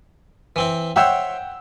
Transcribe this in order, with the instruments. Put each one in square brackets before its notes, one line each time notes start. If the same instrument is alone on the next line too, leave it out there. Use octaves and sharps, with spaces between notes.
[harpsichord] E3 C4 E4
[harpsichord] C5 C#5 E5 [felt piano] F#5 G5 E6